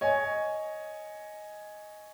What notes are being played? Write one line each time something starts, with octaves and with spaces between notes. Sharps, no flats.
C#5 D#5 G#5